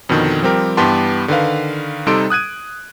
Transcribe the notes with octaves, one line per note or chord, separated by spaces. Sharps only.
F2 B2 D3 D#3
F3 G3 C4 G4 A#4
G2 E3 B3 G4 A5 C6
D3 D#3 B4 F5
C3 G3 D#4 A4 C6 D7
D#6 F#6 G#6 D#7